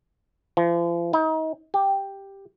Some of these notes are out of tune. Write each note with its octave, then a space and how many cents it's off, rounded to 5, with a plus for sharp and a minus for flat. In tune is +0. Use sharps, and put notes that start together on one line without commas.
F3 -40
D#4 +35
G4 +0